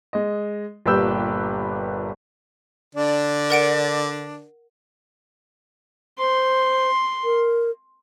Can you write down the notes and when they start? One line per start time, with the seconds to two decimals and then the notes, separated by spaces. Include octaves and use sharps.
0.13 G#3 D#5
0.86 G1 A#2 G4 B4 E6 G6
2.95 D3 D4 D5
3.50 A#4 F#5 D7
6.19 C5 C6
7.24 A#4